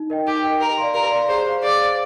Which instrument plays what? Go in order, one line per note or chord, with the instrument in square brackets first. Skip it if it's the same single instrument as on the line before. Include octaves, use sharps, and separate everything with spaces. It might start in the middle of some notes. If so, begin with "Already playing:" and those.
Already playing: [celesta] D#4
A#4 D#5 G5
[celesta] D#4 [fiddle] G4
[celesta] A#4 D#5 G5
[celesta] G4 [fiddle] A#4
[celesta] D5 F5 C6
[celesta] G4 [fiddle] A#4
[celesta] D5 F5 C6
[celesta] G#4 [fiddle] C5
[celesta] C5 F5
[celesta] G#4 [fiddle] D5
[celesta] C5 F5